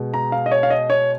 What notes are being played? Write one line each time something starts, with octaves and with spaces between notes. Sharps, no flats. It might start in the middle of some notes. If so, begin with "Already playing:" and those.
Already playing: B2 G#3
A#5
F5
D#5
C#5
F5
D#5
C#5